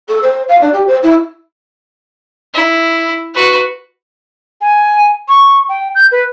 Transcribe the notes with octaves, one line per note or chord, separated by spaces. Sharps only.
A4
C5
F5
D4
G4
C5
E4
E4
F#4 B4
G#5
C#6
G5
G6
B4